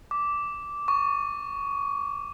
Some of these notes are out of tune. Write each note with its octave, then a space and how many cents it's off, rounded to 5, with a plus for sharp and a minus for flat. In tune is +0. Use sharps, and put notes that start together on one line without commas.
D6 -10
C#6 +15